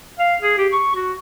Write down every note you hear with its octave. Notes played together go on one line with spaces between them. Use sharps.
F5
G#4
G4
C#6
F#4